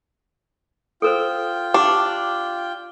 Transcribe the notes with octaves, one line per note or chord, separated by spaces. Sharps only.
F4 A4 A#4 C5 G5
D4 G4 D6